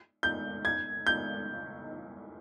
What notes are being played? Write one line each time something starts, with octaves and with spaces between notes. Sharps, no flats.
G6
G#6
G6